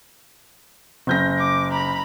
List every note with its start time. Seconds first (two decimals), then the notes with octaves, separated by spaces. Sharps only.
1.07 F#1 G6 A#6
1.38 D6
1.72 A#5 B5